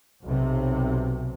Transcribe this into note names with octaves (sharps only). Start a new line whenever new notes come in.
B1 C3